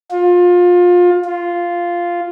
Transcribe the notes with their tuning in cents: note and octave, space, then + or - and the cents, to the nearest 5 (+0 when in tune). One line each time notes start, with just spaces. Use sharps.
F4 +25
F4 -5